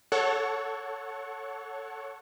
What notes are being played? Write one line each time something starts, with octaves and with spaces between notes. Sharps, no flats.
A4 C#5 F#5 C#6